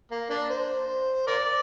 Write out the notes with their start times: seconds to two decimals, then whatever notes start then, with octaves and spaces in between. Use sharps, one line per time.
0.11 A#3
0.30 A#3 D4
0.50 C5
1.27 A#4 D5